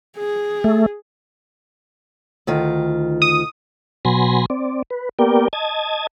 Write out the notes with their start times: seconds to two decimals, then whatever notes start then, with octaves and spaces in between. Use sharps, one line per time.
0.17 G#4
0.64 A3
2.47 D2 D#3 F4
3.22 D#6
4.05 B2 F#3 G#5 B5 C6 A#6
4.50 C4 D5
4.90 B4
5.19 A#3 B3 G4 A#4 D5 G5
5.53 D#5 A5 G#6